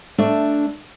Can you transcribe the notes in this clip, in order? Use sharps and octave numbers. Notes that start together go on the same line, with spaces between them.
A3 D4 E5